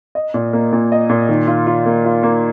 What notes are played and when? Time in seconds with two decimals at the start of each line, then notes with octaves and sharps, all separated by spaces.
0.15 D#5
0.34 A#2
0.53 A#3
0.72 A#2
0.92 D#5
1.09 A#2
1.29 D#3
1.47 F4
1.67 F4
1.86 A#3
2.05 F4
2.23 A#3